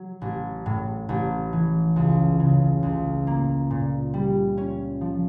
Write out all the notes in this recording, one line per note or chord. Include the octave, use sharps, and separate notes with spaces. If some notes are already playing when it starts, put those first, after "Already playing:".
Already playing: F#3
A1
A2
A1
E3
C#2
C#3
C#2
A#3
A#2
G3
C#4
F3